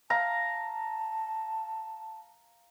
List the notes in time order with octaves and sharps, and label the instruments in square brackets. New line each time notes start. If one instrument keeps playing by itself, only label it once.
[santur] F5 A#5 [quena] A5